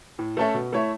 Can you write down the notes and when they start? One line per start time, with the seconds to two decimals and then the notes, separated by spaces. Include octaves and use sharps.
0.19 A2
0.37 A3 C#4 A4 E5
0.54 B2
0.73 A3 E4 C#5 E5